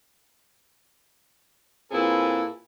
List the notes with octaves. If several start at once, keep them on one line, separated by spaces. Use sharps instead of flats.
A#2 C4 E4 G#4 A4 B4